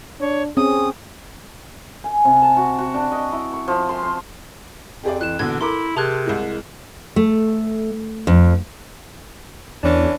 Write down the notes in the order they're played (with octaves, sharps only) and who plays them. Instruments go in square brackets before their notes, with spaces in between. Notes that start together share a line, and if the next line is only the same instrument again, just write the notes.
[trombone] D4 [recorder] C#5
[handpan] C4 C#4 [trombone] G#4 [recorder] D#6
[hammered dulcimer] G#5
C3
A5
F#4
F#4
D4
D#5
E4
C#6
F3
C6
C5
[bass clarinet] F2 [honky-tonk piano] G4 G#4 D5
[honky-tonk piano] E3 [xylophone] F#6 E7
[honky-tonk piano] A#1 E2 B2 [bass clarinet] D3 [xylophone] G#6
[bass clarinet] E4 [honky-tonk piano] A4 A#4 D6 [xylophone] C6
[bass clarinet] C3 [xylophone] G#4 A#4 F#6 [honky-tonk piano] A5 G#6
[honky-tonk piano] C2 G#3 E4
[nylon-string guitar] A3
F2
[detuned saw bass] E2 [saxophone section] E3 C#4 D4